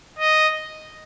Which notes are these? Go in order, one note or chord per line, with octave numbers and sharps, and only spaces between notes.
D#5